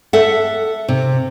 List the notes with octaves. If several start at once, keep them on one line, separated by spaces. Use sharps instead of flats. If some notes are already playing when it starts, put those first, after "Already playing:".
A4 E5 F#5
C3